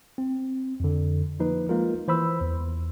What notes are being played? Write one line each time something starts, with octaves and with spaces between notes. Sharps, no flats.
C4
F2 D3
F3 A#3 D#4 B4
G#3 A#3 F4 A#4
E3 C5 B5 E6
E2